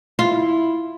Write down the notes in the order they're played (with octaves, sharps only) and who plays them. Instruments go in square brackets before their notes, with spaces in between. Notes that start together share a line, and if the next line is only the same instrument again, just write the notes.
[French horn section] E4 [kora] F4